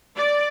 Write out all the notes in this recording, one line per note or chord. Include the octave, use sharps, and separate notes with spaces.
D5